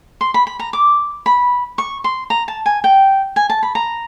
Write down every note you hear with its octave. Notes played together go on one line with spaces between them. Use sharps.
C6
B5
B5
A#5
D6
B5
C#6
C6
A#5
A5
G#5
G5
G#5
A5
B5
A#5